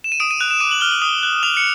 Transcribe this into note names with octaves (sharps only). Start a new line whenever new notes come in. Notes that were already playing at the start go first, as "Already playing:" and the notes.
E7
D#7
D#6 D7
D#7
F#6 F7
E7
D6 D#7
F#7
F6 G7
F#7
D#6
F#6
D#6 F7
C#7